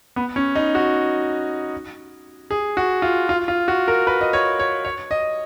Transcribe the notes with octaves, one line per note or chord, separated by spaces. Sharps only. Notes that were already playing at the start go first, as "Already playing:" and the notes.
B3
C#4
D#4
F#4
G#4
F#4
F4
F4
F4
F#4
A#4
B4
D#5
C#5
C#5
C#5
D#5